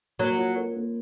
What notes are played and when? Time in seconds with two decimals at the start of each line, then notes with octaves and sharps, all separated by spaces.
0.19 F#3 A#3
0.38 F4
0.57 A#4
0.76 A#3